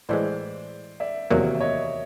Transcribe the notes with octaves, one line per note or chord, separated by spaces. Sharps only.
A2 E3 G#3 C5 D5
D5 E5
E2 C3 D#3 F#3 A#3 D5 E5
E5
C#5 D#5